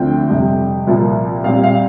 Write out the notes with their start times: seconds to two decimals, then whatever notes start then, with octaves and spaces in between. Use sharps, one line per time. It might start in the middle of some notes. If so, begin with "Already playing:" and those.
Already playing: D2 D3 F3 C4 G5
0.29 F2 C3 G3
0.87 C2 A#2 F3 A#3
1.44 A#2 G3 C4 F5
1.64 F5